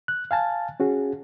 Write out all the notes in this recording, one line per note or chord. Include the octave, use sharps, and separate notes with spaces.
F#6
F5 G#5 A5 A6
C#4 F#4 G#4